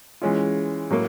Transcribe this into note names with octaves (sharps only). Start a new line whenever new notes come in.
E3 G#3 C#4 F4
A2 F#3 A#3